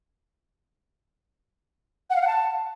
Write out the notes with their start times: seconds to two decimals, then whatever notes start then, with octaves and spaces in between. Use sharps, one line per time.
2.10 F#5
2.16 F5
2.21 F#5
2.27 A5